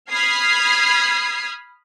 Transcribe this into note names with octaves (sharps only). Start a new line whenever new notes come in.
B5 D#6 F6 G#6 C7